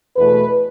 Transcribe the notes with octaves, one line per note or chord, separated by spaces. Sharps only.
E2 B2 A3 B4